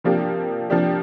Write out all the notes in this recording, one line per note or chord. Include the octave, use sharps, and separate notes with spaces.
C3 F3 A#3 D4 G4
C3 F3 A#3 D4 G4